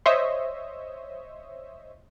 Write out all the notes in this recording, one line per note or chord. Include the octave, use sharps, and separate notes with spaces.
C5 C#5 D#5 E5